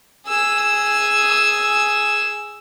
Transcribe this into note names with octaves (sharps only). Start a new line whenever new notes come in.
G#4 E6